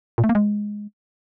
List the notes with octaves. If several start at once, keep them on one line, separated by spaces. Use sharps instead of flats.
A#2
A3
A#3
G#3